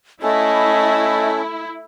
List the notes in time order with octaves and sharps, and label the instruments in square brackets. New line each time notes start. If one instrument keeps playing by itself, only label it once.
[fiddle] A3 [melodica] C#4 A4 [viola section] E4 [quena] D#5